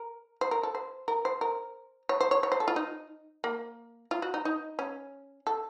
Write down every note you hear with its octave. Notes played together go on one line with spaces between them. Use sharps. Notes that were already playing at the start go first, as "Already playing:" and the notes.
Already playing: A#4
C5
A#4
A4
C5
A#4
C5
A#4
C#5
C5
C#5
C#5
C5
A4
F4
D#4
A#3
F4
F#4
D#4
D#4
C#4
A4